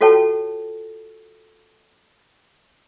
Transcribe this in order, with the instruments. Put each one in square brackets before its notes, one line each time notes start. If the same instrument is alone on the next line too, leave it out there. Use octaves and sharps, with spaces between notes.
[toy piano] F4 F#4 A4 C#5 G5 A5